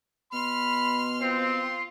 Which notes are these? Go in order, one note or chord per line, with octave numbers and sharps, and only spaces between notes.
B2 B5 C6 F6
C4 F4 C6